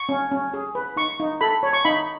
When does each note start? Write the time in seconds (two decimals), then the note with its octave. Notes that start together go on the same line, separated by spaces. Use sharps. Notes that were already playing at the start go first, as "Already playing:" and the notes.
Already playing: C#6
0.09 C#4
0.31 C#4
0.54 G#4
0.75 B4
0.96 D#4 C#6
1.20 D#4
1.41 A4 B5
1.63 C#5
1.73 C#6
1.85 D#4 B5